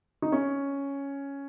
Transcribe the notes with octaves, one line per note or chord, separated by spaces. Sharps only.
D#4
C#4